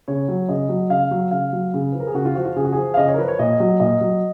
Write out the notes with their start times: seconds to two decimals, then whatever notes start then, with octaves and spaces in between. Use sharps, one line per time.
0.08 C#3 C#5
0.28 F#3
0.49 C#3 D#5
0.69 F#3
0.90 C#3 F5
1.11 F#3
1.31 C#3 F5
1.53 F#3
1.74 C#3
1.92 F3 B4
2.00 A#4
2.07 G#4
2.14 C#3 F#4
2.25 F4
2.35 F3 F#4
2.45 F4
2.56 C#3 G#4
2.64 F#4
2.72 F3 G#4
2.94 F5
2.97 C#3 D#5
3.08 C#5
3.14 A#4
3.18 F3 B4
3.28 C#5
3.39 A#2 D#5
3.60 F#3
3.80 A#2 D#5
4.01 F#3